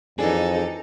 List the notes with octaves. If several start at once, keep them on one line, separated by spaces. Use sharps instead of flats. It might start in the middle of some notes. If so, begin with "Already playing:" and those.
F2 E3 D4 D#4 G#4 A4